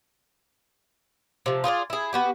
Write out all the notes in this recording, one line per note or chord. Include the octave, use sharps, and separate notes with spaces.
C3 F3
F4 G#4 A#4 D5
E4 G#4
B3 F#4 G4